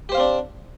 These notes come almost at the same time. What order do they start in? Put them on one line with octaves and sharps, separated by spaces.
G4 C5 F5 C4 D4